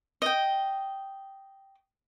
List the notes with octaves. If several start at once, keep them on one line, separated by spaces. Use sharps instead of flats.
D#5 G5